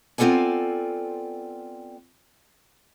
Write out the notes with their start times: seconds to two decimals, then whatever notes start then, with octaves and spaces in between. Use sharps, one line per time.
0.18 B3 C4 F4 A4 D5 G#5